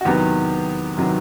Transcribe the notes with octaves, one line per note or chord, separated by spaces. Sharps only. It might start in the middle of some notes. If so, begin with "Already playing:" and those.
F#4
E2 C3 D#3 F#3 B3 G4
C3 D#3 F#3 B3